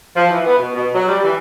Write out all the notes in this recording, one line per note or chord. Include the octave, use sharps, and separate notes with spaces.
F3
E3
B3
B2
B2
F#3
G3
E3